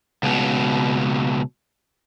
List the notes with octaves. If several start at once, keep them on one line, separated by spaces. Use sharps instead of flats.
C#2 B2